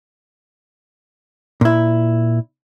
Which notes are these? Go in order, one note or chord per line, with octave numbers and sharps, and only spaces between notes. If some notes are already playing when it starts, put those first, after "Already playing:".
A#2 E4